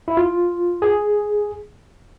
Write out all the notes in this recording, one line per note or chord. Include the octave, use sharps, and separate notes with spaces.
E4
F4
G#4